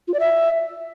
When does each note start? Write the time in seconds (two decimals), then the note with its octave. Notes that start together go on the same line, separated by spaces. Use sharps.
0.08 F4
0.14 D5
0.20 E5